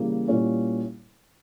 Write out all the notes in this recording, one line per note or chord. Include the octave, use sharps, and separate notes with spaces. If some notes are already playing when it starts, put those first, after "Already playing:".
Already playing: C#3 E3 G3 A#3
A#2 G3 A#3 C#4 E4